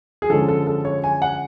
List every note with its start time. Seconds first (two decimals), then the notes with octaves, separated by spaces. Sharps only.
0.22 G#4
0.30 D3 F3 G#3 C#4 A4
0.48 A4
0.67 A4
0.85 C#5
1.04 G#5
1.22 F#5